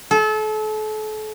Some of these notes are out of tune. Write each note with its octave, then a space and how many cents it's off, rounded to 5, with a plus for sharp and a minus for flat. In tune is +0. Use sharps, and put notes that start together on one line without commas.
A4 -35